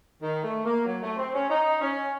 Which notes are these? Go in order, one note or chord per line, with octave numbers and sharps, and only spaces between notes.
D#3
A3
A#3
F#3
A3
C4
C#4
D#4
C#4